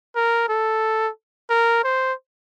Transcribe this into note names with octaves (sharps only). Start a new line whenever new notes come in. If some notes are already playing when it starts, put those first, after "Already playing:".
A#4
A4
A#4
C5